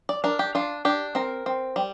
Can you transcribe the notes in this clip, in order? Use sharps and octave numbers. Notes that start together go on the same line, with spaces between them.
D5
D4 A#4
G4
D4 F4
D4 G4
C4 A#4
C4
G3